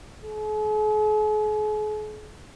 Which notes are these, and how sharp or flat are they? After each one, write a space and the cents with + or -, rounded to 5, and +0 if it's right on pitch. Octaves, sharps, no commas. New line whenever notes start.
G#4 +45